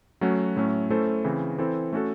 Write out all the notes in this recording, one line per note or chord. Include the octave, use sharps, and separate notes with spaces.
F#3 A3 C#4 F#4
A2 F#3 A3 C#4
A3 C#4 E4 A4 C5
C#3 E3 C4
E3 C4 E4 A4 C5
A3 C#4 F#4 A4